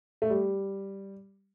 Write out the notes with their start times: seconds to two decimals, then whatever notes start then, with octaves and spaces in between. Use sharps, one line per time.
0.22 A3
0.30 G3